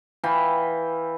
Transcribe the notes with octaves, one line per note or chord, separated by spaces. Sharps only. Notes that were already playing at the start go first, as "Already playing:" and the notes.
E3 F5 G5 B5